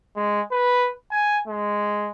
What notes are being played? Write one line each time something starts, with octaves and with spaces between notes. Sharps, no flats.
G#3
B4
G#5
G#3